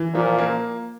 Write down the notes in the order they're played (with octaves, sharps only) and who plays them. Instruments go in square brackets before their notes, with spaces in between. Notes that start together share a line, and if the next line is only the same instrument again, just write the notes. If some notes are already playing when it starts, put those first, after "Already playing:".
Already playing: [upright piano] E3
[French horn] A#2 [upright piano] F3
[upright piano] A#3